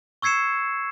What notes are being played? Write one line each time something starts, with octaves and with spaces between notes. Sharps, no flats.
C#6 E6 G#6 C7 C#7 E7